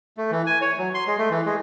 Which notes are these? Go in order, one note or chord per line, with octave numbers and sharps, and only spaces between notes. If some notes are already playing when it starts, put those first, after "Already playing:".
A3
E3
G#5
C#5
F#3
C6
G#3
A3
E3
G#3